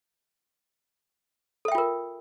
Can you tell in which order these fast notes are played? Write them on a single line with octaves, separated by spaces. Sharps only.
A4 E5 G5 F4 A#4